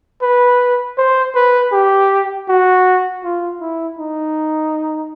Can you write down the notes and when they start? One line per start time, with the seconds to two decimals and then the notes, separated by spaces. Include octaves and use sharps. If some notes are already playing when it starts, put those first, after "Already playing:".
0.22 B4
0.98 C5
1.35 B4
1.72 G4
2.48 F#4
3.24 F4
3.61 E4
3.99 D#4